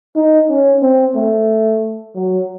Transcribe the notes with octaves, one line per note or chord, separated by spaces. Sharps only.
D#4
C#4
C4
A3
F#3